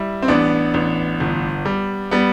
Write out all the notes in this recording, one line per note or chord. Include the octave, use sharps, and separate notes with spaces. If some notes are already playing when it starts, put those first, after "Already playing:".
Already playing: G3 E4
C4
A1 B3 D4
A1
G1
G3
G3 B3